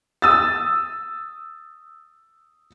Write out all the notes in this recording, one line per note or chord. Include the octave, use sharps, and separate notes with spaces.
D#6 E6 A6